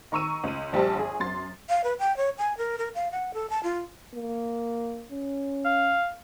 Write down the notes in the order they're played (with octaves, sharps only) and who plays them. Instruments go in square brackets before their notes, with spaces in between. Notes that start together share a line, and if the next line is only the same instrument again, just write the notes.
[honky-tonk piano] D#3 A#5 C#6 E6 D#7
C#2 D#7
A#1 G3 G4 C5 A5
G1 G#4
F#2 C6 A6
[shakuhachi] F5
B4
G5
C#5
G#5
A#4
A#4
F5
F#5
A4
A5
F4
[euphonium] A#3
C#4
[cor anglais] F5